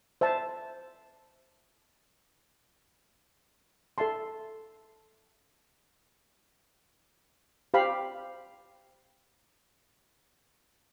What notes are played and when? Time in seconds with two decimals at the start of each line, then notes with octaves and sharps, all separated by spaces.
0.21 C5 E5 A5
3.98 A4 E5 A5 C6
7.74 G4 C5 F5 B5